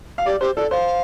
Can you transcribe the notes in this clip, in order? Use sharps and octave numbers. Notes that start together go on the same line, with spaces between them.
F5
G4 D5
G4 C5
A4 D5
C5 F5